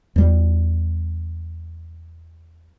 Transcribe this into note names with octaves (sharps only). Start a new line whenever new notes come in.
E2 G3